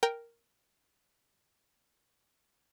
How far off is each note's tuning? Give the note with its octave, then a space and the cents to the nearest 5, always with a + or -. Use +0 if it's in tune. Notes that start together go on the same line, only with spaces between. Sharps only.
A#4 +0 G5 +0